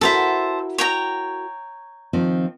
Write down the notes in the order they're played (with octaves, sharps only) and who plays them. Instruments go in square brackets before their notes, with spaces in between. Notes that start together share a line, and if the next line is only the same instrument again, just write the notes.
[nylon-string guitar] E4 F#4 A#4 [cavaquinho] A4 C5 E5
[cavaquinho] C#5 G5 A#5
[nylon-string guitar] D#3 F3 C4